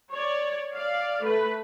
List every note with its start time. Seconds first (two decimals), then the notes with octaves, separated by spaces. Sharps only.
0.12 C#5 D5
0.74 D5 F5
1.22 A3 B4